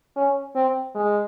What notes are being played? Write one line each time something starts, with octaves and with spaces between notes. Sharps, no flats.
C#4
C4
G#3